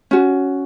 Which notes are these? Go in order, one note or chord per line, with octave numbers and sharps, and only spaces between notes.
C#4 F#4